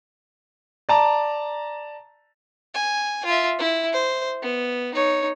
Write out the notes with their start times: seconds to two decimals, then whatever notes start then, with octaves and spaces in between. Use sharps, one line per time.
0.89 D5 A5 A#5
2.74 G#5
3.25 F4 E5
3.59 E4
3.93 C5
4.42 B3
4.95 D#4 C#5